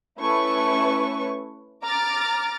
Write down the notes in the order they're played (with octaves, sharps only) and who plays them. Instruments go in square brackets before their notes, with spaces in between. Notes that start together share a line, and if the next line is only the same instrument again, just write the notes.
[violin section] A3 C#4 E4 B4 C#6
A#5 D6 F6 A6